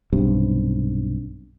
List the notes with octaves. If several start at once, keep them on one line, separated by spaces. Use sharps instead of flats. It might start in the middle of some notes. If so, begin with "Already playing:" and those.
B1 G2 C3